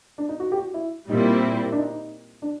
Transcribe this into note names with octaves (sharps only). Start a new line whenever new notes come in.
D4
D#4
F#4
G4
F#4
E4
A#2 G3 C4 D#4 E4
D4
D#4
D4